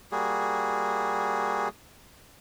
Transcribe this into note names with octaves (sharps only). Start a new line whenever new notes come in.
G3 A#3 F#4 G#4